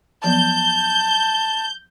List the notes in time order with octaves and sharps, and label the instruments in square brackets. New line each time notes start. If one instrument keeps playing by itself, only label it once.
[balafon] F3 F#3 B3 [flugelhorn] A5 [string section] G6